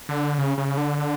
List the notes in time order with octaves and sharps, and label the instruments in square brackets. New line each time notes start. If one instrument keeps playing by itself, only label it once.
[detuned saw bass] D3
C#3
C#3
D3